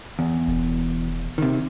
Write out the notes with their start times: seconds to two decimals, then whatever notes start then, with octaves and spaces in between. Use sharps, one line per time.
0.19 E2
0.48 E1
1.38 C3 D#3